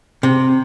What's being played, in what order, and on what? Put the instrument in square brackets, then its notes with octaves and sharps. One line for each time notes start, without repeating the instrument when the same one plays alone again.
[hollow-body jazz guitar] C3